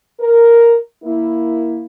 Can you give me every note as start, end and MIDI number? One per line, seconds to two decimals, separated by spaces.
0.20 0.76 70
1.04 1.86 58
1.04 1.86 64